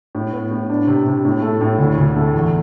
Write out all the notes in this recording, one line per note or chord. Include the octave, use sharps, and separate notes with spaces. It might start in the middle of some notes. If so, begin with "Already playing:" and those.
A2
B3
A2
D4
C3
C3
A2
A3
A2
D2
D2
A3
E2